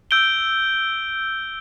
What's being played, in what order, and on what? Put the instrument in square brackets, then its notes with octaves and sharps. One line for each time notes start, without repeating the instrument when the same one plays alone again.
[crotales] E6 G6 D7 G7